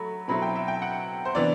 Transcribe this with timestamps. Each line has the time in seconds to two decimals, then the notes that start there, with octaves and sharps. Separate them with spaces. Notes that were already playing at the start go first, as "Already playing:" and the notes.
Already playing: F#3 A3 B5
0.28 B2 F#3 C4 E4 B5
0.42 G5
0.55 E5
0.68 G5
0.82 F#5
1.25 C5
1.35 C3 E3 B3 D4 D5